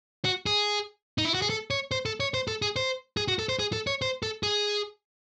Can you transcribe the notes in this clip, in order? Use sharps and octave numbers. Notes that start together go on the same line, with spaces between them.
F#4
G#4
D#4
E4
F#4
G#4
A4
C#5
C5
A4
C#5
C5
A4
G#4
C5
G#4
F#4
A4
C5
G#4
A4
C#5
C5
A4
G#4